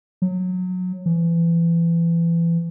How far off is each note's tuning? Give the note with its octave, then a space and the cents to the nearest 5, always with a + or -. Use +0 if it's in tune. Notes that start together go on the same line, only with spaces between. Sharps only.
F#3 -20
E3 +30